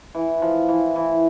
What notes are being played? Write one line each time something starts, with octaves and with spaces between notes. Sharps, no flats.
E3
F3
E3
E3